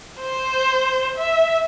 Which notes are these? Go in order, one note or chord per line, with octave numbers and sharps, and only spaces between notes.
C5
E5